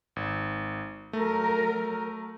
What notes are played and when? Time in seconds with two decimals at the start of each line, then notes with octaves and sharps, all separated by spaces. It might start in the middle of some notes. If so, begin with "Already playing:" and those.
0.16 G#1
1.13 F#3 A3 A#4